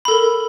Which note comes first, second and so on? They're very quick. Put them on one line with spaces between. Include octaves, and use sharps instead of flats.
B5 A4 A#4